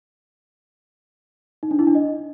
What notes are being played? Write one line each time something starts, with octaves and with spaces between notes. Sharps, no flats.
D#4
D4
E4
D4
D#5